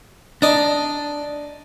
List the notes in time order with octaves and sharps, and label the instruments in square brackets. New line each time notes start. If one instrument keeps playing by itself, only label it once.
[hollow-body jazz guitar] D4 [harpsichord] D5 D#5 A#5